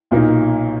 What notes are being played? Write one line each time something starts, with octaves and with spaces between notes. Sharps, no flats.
B1 A#2 A#3 D#4